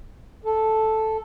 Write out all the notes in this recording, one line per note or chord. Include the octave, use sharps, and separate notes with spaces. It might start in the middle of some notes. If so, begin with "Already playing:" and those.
A4